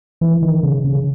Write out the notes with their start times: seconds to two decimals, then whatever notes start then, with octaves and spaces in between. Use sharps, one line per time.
0.21 E3
0.42 D#3
0.63 C#3
0.85 C#3